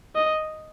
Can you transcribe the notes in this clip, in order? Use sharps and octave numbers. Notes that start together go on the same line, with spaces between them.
D#5